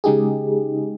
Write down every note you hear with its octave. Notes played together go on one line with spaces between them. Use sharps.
C#3 G#3 D#4 G4 G#4